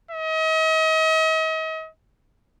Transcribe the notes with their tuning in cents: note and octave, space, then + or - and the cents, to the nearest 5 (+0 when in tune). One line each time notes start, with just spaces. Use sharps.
D#5 +40